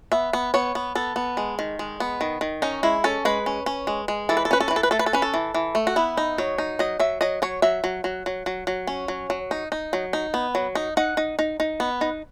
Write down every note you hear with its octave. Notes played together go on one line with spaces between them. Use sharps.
B3 E5
B3
B3 C#5
B3
B3 A4
B3
G#3
D#3
G#3
B3
D#3
D#3
C#4 D#4
G#3 E4
C#4 A4
G#3 B4
C#4
C#4
G#3
G#3
E3 A4
B4
A4
C#4 B4
A4
B4
E3
A4
B4
A3 A4
B4
A4
C#4 B4
A4
E3
E3
A3
F#4
B3 E4
D#4
F#3 C#5
D#4
F#3 D#5
F#3 E5
F#3 D#5
F#3 C#5
F#3 E5
F#3
F#3
F#3
F#3
F#3
C#4
F#3
F#3
D#4
D#4
F#3
D#4
B3
F#3
D#4
D#4 F#5
D#4
D#4
D#4
B3
D#4